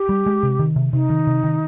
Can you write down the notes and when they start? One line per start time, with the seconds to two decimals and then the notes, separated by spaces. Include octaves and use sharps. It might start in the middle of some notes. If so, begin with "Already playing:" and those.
Already playing: G4
0.09 G3
0.26 G#3
0.43 C3
0.59 D#3
0.76 C3
0.93 C3 D#4
1.10 D#3
1.27 C3
1.44 D#3